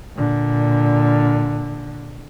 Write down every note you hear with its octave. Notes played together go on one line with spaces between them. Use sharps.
A#2 D3